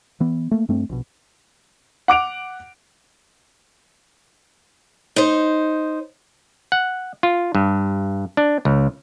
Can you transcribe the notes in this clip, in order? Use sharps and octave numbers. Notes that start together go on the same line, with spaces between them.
E3 B3
A3 A#3
G2 A3 C4
A#1 B2
F#5 D6 D7 F7
D#4 C5
F#5
F4
G2
D4
C#2